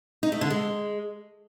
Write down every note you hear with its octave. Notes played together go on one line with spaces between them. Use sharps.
D#4
A3
D3
G#3